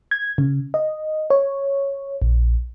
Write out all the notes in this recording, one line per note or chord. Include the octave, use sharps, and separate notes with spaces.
G#6
C#3
D#5
C#5
A#1